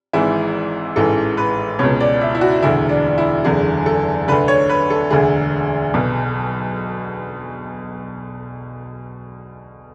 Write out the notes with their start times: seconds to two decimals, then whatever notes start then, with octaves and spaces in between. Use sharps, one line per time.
0.13 G#1 G#2 E3 E4
0.96 A1 G#2 E3 A4
1.37 B4
1.79 C#2 B2 C#5
2.00 D5
2.21 E5
2.35 E4
2.41 F#4
2.63 E1 D2 D3 E4
2.89 D4
3.08 D4
3.18 E4
3.44 F#1 E2 D3 G#4
3.86 A4
4.28 D3 B4
4.32 D2
4.48 C#5
4.70 B4
4.90 A4
5.10 E1 D2 D3 G#4
5.94 B1 B2